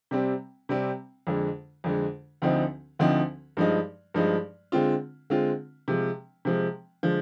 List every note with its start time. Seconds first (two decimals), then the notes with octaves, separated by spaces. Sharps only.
0.11 C3 G3 C4
0.69 C3 G3 C4
1.27 F2 D3 G#3
1.84 F2 D3 G#3
2.42 D2 D3 F3 C4 D#4
2.99 D2 D3 F3 C4 D#4
3.57 G2 F3 G#3 D#4
4.14 G2 F3 G#3 D#4
4.72 D3 G#3 C4 F4
5.30 D3 G#3 C4 F4
5.88 C3 F3 G#3
6.45 C3 F3 G#3
7.03 D3 F3 G#3